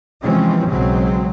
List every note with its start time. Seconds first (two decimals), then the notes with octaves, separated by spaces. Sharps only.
0.23 C3 E3 F3 G#3 C4 C#4
0.69 B1 C#3 F#3 G#3 C4